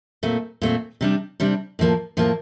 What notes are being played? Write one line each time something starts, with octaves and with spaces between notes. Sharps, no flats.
A#2 A3 C4
A#2 A3 C4
C3 G3 D4
C3 G3 D4
A2 F3 A#3
A2 F3 A#3